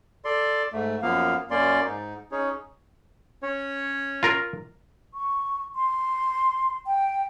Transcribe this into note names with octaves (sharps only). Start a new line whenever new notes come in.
A4 D5 C6
G#2 A3
F#2 F3 A#3 B3 F5
F#2 A#3 C#4 D5 C6
G#2 D#4
C#4 D#4 G#4 C#5
C#4 C#5
F4 A#4
C#6
C6
G5